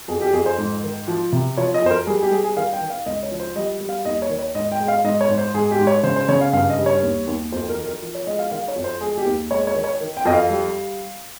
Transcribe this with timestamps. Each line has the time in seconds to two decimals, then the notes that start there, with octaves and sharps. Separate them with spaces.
0.08 F2 G#4
0.21 G4
0.33 F2 G#4
0.46 C5
0.58 G#2
0.83 D#3
1.08 F3
1.32 C3
1.57 F3 C#5
1.74 D#5
1.82 F2 C5
1.91 A#4
2.07 G3 G#4
2.23 G4
2.31 G3 G#4
2.44 G#4
2.56 D#3 F5
2.73 G5
2.81 D#3
2.90 F5
3.06 C#2 D#5
3.23 C#5
3.31 F3
3.40 C5
3.56 G3 D#5
3.81 G3
3.89 F5
4.05 D#2 D#5
4.22 C#5
4.30 D#3
4.39 C#5
4.55 G#2 D#5
4.72 G5
4.80 G#3
4.88 F5
5.04 G#2 D#5
5.21 C#5
5.29 G#2
5.38 C5
5.54 G#2 G#4
5.71 G4
5.79 G#2
5.87 C#5
6.03 C#3 C5
6.16 C5
6.28 C#3 C#5
6.41 F5
6.53 G2 F5
6.70 D#5
6.78 G3
6.86 C#5
7.03 D#2
7.27 D#2
7.52 F2 C5
7.69 A#4
7.77 D#3
7.86 A#4
8.02 F3
8.15 C#5
8.27 G#3 D#5
8.39 F5
8.51 D#3 F5
8.68 C#5
8.76 F2
8.84 C5
9.01 G#3 G#4
9.18 G4
9.26 D#2
9.51 G#3 C#5
9.67 C#5
9.76 D#3
9.84 C#5
10.01 D#3
10.17 G5
10.25 F2 D#5
10.33 F5
10.50 G3